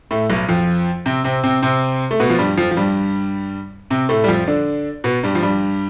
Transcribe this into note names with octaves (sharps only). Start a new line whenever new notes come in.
A2 A3
B1 B2
F2 F3
C3 C4
C3 C4
C3 C4
C3 C4
A3
B2 B3
F3
G2 G3
F2 F3
F3
G2 G3
C3 C4
A2 A3
G3
F2 F3
D3 D4
B2 B3
G2 G3
F3
G2 G3